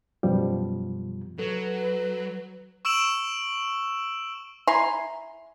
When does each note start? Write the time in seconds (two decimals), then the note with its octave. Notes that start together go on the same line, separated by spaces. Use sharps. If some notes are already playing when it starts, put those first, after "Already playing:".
0.23 F#2 B2 F3 G3
1.39 F#3 A4 B4
2.85 C#6 E6 D7 E7 F#7
4.67 E4 G#5 A#5 C6